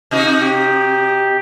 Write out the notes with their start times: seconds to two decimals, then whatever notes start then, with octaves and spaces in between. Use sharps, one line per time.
0.11 C3 D#4 F#4
0.40 G4